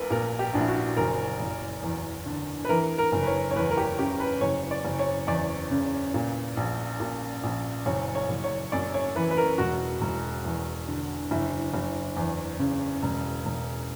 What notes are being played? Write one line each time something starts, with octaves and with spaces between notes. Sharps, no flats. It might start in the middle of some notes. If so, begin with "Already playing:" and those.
Already playing: A#1 A#2 A#4 B4
A#2 A#4
G4
A#1 D4
E4
F#4
F#1 A#4
F#1
E2
D3
B4
E3 A#4
A#4
F#1
B4
C#5
C#5
E2 B4
A#4
G4
C#3 G4
B4
F#1 C#5
D5
F#1
C#5
E2 D5
C#3
A#2
A#1
A#2
A#1
F#1 C#5
C#5
F#1
C#5
F#2 D5
C#5
E3 B4
B4
A#4
E1 F#4
E1
E2
D3
F#1 E4
F#1
E2
C#3
E1
E1